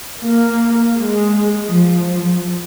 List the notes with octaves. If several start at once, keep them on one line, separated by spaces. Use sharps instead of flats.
A#3
G#3
F3